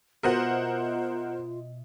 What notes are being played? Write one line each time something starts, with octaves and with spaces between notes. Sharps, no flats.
B2 F4 A#4 C5 D#5 E5 F#5